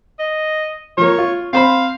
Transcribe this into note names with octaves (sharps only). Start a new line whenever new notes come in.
D#5
F3 A#3 C#5
F4
C4 C5 F5 B5